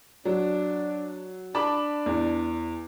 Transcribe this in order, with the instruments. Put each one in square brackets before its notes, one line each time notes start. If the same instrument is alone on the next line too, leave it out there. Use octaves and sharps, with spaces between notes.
[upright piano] F#3 [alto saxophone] D4
[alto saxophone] D4 [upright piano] A5 B5 D6
[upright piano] E2